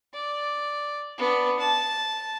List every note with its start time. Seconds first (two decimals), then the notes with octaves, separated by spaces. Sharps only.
0.13 D5
1.18 B3 D4
1.59 A5